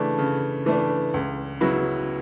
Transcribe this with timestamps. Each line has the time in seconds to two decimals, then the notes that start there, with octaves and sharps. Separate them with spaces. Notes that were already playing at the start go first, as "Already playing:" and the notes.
Already playing: C#3 E3 A3 D4
0.18 C#3
0.66 E3 A3 D4
1.14 C#2
1.60 C#3 F#3 B3 E4